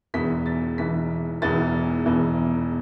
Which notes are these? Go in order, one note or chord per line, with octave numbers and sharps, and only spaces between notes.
E1 E2 E3 B6
A6
E1 E2 E3 B6
E1 E2 E3 A6
E1 E2 E3